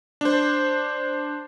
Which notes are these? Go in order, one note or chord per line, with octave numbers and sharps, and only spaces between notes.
D4 C5